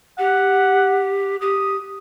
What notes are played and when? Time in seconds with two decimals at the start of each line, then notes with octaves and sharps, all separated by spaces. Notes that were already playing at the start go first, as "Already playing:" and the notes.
0.19 G4 F#5
1.41 G4 D#6